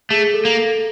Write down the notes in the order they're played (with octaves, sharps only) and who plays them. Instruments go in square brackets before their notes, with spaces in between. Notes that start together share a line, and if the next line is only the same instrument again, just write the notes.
[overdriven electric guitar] A3 [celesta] G#4
[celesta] A4
[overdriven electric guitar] A#3
[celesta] A4